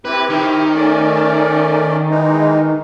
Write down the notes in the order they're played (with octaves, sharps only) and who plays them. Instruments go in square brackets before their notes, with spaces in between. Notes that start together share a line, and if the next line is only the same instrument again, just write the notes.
[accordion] C4 E4 G4 [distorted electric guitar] B4
[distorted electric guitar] D#3
[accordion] A3 C#4 D5
E3 G#3 D#4